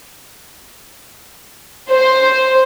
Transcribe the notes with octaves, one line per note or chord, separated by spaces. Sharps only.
C5